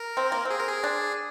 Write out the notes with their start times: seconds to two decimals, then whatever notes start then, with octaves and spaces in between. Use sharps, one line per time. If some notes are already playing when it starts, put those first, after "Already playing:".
Already playing: A#4
0.17 C4
0.32 A#3
0.45 C4
0.51 G#4
0.59 A#4
0.68 G#4
0.84 D4